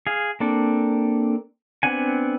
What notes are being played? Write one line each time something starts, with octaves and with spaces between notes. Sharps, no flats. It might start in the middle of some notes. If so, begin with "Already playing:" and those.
G#4 F5
A#3 C4 D4 A4
B3 C4 D4 F#5 G#5